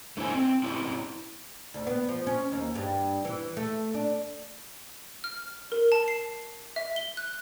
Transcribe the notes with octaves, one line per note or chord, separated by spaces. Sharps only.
A3 D4 E4 C5 G#5
C4
C4 C#4 E4
D2
B3
F3
C#4
D#2
G2
E3
A3
D4
F6
A#4
A5
C7
E5
G7
F#6